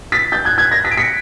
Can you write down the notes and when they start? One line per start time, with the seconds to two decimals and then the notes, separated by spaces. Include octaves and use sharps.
0.12 A6 B6
0.32 G6 A6
0.45 F#6 G#6
0.58 F#6 G#6
0.71 G#6 A#6
0.84 A6 B6
0.91 D7
0.97 B6 C#7